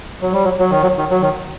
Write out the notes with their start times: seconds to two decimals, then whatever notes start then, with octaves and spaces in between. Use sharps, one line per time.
0.22 F#3
0.33 G3
0.44 F#3
0.59 F#3
0.70 D#3
0.82 F#3
0.97 D#3
1.10 F#3
1.22 D#3